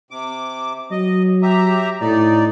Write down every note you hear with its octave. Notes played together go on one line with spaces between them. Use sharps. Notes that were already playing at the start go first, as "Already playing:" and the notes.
C3 D6
F#3 D#5
G4 E5 A#5
A2 D#4 D5